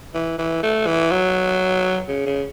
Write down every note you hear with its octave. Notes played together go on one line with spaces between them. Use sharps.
E3
E3
A3
E3
F#3
C#3
C#3